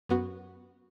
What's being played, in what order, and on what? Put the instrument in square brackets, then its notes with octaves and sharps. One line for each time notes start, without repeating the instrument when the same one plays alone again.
[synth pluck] F#2 B3 F#4